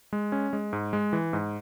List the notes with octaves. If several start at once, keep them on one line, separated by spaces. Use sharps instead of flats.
G#3
C#4
G#3
G#2
G#3
E3
G#2